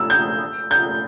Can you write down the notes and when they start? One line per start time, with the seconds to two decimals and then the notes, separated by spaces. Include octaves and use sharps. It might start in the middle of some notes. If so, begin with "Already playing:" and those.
Already playing: E6
0.10 G6
0.71 G6